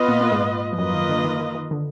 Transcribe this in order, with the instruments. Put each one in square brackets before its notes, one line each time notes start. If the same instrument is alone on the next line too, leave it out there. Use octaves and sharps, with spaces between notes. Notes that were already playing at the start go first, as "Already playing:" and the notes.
Already playing: [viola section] B3 F4 B4 D#5
[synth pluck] A#2 A#3
A#3
G#2 G#3
F3
[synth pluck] F#2 F#3 [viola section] A#3 F4 B4 D#5
[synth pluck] D#3
D3
D#3
D#3
D#3
D3